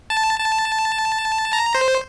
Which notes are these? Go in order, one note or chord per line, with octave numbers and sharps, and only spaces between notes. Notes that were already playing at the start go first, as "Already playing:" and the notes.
A5
A5
A#5
C5